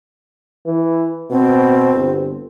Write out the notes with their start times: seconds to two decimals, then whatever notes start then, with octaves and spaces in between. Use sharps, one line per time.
0.66 E3
1.30 B2 C4
1.93 G1